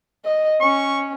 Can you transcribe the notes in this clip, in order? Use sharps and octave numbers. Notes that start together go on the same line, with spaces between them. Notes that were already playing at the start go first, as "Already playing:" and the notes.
D#5
C#4 C#6